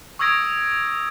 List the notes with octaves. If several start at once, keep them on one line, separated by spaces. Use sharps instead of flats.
C#6 D#6 E6 G#6 A#6 D7